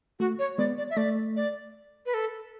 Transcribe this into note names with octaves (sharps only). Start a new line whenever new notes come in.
A3 F#4
C#5
G#3 B3 D5
D5
E5
A3 D5
D5
B4
A4